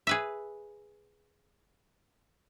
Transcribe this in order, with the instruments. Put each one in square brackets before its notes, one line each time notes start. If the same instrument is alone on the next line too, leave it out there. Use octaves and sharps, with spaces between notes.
[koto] G#4 B4 E5